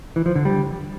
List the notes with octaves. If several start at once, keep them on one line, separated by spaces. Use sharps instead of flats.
E3
F3
D3
G3